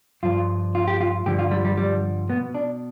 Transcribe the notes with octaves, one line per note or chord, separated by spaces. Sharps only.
G2 F3 F4
F4
G4
F4
G2 D3 F3 G4
F4
G3
G3
G3
B2 B3
D4